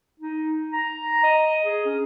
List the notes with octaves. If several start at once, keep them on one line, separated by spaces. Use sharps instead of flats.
D#4
A#5
D#5
G#4
C#4